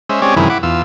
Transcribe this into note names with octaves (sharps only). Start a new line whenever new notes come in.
G#3 C#4 C5 E5
G#3 C4 C#4 G4 C#5 D5
F#2 C3 D#3 E3 G#3 E4
E4 F#5 B5 D6
E2 F4 E6